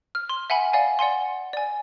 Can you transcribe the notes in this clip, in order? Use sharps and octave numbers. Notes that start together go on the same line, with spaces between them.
F6
C6
E5 F#5 G#5 B5
D5 F5 G#5
D5 F#5 G#5 C6
D5 G#5